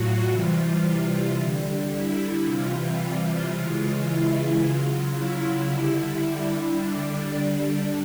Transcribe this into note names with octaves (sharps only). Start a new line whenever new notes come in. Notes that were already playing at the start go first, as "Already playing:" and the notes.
Already playing: A2 F#3 F4 F#4
C3 E3 G3
D3 G3
E4
C3 E3 G3 F4
F4
C#3 E3 G#3
E4
C#3 F#3 F4
E4
D3 G3 E4
D3 G3 D4